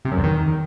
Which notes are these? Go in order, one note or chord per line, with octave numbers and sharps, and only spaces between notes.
C3
F#2
E2
D#3